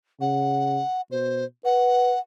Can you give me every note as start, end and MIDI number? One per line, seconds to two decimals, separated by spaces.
0.21 0.81 49
0.21 1.01 78
1.11 1.44 47
1.11 1.45 72
1.65 2.15 71
1.65 2.20 78